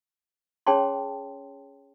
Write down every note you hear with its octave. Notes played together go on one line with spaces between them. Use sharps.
C#4 G#4 C#5 G5 A5 C6